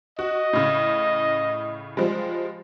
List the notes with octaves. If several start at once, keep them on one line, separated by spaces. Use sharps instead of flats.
F#4 D#5
A2 C#3
F3 G3 G#3